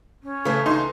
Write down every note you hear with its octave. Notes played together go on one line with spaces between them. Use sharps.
C#4
C#3 E3 A3
C#2 D#4 C6